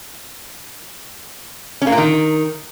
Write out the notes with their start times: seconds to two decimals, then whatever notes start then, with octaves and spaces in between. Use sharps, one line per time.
1.82 C#4
1.87 A#3
1.92 A#2
1.98 D#3